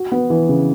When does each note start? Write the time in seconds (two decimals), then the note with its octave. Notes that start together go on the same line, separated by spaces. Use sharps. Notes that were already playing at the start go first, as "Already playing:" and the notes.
Already playing: F#4
0.12 B3
0.30 E3
0.49 C#3